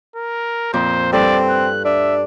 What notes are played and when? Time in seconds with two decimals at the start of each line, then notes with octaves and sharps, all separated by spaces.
0.16 A#4
0.73 F2 A#2 C5 D6
1.12 G2 C4 A4 B4 D5
1.50 F#6
1.85 D4 E5